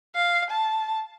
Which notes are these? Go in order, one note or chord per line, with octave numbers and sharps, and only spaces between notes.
F5
A5